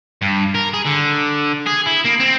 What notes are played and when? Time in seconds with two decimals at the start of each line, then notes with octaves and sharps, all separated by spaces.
0.22 G2
0.55 A#4
0.74 G#4
0.86 D3
1.67 G#4
1.87 E4
2.05 A#3
2.20 C4